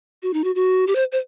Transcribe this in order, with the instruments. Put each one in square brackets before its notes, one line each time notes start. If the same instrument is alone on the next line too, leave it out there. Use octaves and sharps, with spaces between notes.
[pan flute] F#4
D#4
F#4
F#4
G4
C5
C5